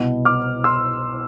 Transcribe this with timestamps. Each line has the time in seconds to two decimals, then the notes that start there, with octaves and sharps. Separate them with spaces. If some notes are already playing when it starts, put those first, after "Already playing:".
Already playing: C2 B2 B3
0.25 D6 F6
0.64 C6 E6